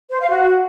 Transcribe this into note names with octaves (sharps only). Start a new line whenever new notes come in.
C5
F5
F#4